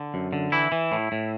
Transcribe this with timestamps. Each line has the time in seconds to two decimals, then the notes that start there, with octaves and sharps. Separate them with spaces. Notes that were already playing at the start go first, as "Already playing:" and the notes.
Already playing: D3
0.14 F#2
0.33 D3
0.52 E3 E4
0.72 E3
0.92 A2
1.12 A2